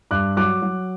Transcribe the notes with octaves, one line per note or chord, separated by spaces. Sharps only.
G2 D6 F#6
F#3 D6 F#6
F#3